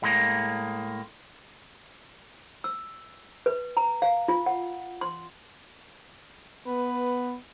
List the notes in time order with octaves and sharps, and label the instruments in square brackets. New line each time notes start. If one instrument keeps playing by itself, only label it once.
[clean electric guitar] A2 G#3 A#3
[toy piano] E6
B4
A#5
F5
F4
F#5
C6
[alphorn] B3 [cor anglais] B4